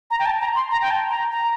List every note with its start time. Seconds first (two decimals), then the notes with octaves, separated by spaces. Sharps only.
0.11 A#5
0.20 G5
0.26 A5
0.40 A#5
0.55 C6
0.71 A#5
0.81 G5
0.91 A5
1.10 A#5
1.31 A#5